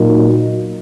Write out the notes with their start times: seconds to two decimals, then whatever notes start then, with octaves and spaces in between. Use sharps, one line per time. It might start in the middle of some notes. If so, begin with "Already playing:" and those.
Already playing: A#2 F#3 A#3 D#4